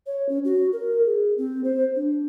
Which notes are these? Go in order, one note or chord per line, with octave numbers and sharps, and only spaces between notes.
C#5
C#4
F#4
A#4
G#4
C4
C5
D4